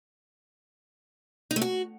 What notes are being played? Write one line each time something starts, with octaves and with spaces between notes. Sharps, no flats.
D#4
A3
F#4